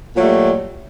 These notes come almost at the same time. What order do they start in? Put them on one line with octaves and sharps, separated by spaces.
A#2 F#3 A3 G3